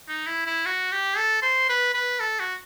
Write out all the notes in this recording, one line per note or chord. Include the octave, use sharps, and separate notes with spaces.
D#4
E4
E4
F#4
G4
A4
C5
B4
B4
A4
F#4